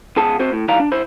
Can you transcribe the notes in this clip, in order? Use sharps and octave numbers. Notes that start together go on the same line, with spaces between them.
C#2 B3 G#4 A5
C4 F#4 C5
A2
D#3 E3 G3 D5 F5 A#5
D4
E4 C5